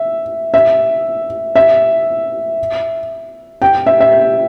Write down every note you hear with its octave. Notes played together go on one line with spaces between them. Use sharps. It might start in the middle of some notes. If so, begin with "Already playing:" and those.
Already playing: E5
E5
E5
G5
E5
E5